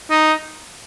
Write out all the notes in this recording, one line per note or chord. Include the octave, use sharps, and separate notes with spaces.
D#4